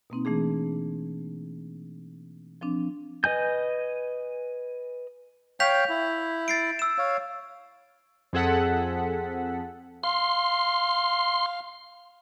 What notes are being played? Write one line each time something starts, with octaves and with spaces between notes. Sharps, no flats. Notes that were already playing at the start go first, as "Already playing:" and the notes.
B2 A#3 C4 D#4
E3 A3 D4 G#4
F3 C4 D4
B4 D#5 G#5 G6
C#5 F5 G5 G6 B6 F7
E4
A6 C7 D7
E6 E7
C#5 F5
F2 C4 G#4 A4 F#5 B6
F5 C6